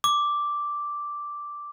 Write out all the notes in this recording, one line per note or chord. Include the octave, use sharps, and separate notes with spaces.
D6